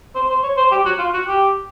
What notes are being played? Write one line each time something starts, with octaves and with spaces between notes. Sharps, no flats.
C5
C5
C#5
C5
G4
F#4
F4
F#4
G4